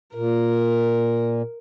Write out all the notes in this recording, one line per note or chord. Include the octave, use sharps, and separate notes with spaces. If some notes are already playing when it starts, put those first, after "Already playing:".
A#2 A#4